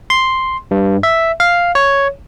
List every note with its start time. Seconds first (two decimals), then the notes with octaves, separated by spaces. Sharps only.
0.10 C6
0.71 G2
1.03 E5
1.40 F5
1.75 C#5